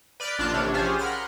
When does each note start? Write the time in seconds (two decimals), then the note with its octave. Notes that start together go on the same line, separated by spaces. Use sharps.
0.20 B4 D5 F6 G6 D7
0.39 A#1 D4 F4 A5 G6 A#6
0.53 A#1 C3 D4 C#5
0.74 C#4 F4 G4 G#4 C5 G#5
0.99 A#4 F#5 B5 C6 F6 F#6